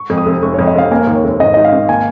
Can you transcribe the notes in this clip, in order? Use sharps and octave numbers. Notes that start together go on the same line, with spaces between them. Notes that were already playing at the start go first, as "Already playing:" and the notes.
Already playing: C#6
F2
D#6
F1
F1 C#6
F2 C#5
D#5
F1 F5
A#3 G#5
D#2
C#5
F1
G#1 D#5
G#2 D#5
F5
G#1
A#3 G#5